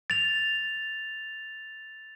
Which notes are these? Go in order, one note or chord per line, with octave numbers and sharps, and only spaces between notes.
A6 F7